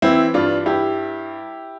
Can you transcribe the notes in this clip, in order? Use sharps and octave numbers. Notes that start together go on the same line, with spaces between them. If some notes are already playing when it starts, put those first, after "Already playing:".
E3 C4 E4
G2 D4 F4
G2 E4 G4